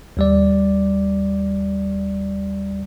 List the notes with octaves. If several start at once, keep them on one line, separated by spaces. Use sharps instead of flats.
D#2 G3 D5